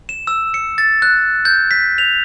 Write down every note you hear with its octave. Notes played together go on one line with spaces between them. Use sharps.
E7
E6
C#7
A6
F#6
G6
B6
F7